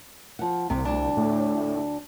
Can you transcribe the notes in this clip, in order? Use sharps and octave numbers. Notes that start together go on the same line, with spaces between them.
F3 F#5
C2 C3
D2 D4
A2